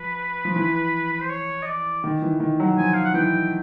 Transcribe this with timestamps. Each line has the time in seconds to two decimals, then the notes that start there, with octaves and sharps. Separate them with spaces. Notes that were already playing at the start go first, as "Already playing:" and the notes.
Already playing: F3 B4
0.45 F3
0.56 E3
1.13 B4
1.21 C5
1.30 C#5
1.63 D#5
1.67 D5
2.04 D#3
2.22 E3
2.40 D#3
2.60 F#3
2.78 F3 G#5
2.94 F5
3.05 F#5
3.14 E3 G5